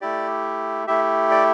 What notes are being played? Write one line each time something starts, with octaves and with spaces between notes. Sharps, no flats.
A3 E4 G4 D5
A3 E4 G4 E5
D5